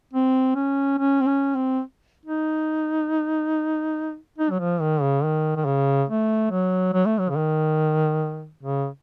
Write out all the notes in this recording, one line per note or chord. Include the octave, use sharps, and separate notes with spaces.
C4
C#4
C#4
C4
C#4
C4
D#4
D#4
F#3
F3
D#3
C#3
D#3
D#3
C#3
A3
F#3
F#3
A3
F#3
C#3
D#3
C#3